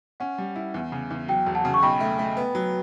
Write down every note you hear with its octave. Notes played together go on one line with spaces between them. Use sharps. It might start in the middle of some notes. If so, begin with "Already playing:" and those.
C#4 F#5
G3
E4
E2
C#3
E2
F#3 G5
E1
F#5 A5
C#3
C#6
B1 G5 B5
A3
A3
B3
F#3